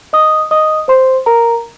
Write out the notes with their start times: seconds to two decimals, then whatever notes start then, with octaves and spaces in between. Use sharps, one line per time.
0.13 D#5 D#6
0.51 D#5 D#6
0.88 C5 C6
1.26 A#4 A#5